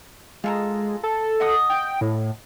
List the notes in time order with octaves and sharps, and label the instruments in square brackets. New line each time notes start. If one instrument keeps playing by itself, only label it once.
[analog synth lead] G#3 [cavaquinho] F4 A4 A#5
[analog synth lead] A4
[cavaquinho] D#5 F#5 D#6
[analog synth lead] G5
A2